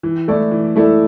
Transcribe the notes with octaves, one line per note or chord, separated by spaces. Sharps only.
E3
A3 E4 A4 D5
E3
A3 E4 A4 D5